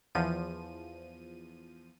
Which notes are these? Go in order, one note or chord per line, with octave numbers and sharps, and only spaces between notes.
E2 F3 D#7